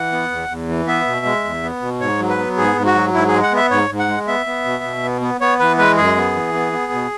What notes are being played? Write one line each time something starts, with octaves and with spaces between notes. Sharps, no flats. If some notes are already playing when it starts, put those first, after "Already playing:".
Already playing: E3 F#5
B3
E2
E2
E3
B3 E5
B2
G#3
E2
B3
B2
G#2 C#5
F#3
B4
B3
G#2 G#4
G#2
F#4
F#3
G#2 E4
G#4
G#3
F#5
B3 E5
G#2 C#5
G#2
F#5
G#3
B3 E5
B3
B2
B2
B3
B3
B3 C#5
E3 B4
G#3 B4
F#2 G#4
B3
E3
B3
B3
B2